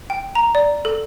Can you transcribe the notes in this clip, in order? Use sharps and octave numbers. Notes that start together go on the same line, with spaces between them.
G5
A#5
D5
A4